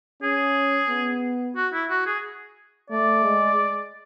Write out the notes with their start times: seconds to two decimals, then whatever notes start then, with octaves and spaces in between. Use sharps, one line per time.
0.22 C#4 G#4
0.89 B3
1.56 F#4
1.73 E4
1.90 F#4
2.06 G#4
2.90 A3 D5
3.23 G#3